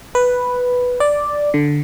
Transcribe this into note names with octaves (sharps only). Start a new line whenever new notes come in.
B4
D5
D3